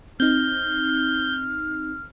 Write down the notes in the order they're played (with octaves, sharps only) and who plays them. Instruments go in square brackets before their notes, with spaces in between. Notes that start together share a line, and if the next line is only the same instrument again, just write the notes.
[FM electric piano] C4 D#4 [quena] F6 [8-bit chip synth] G6